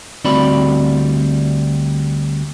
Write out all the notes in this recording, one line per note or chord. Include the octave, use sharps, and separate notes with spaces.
D2 G3 C4 F#4 D5 B5